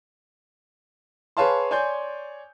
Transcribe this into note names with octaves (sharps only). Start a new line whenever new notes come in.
G#4 B4 C#5 F5 A5 C6
C#5 D5 G#5 C6 G6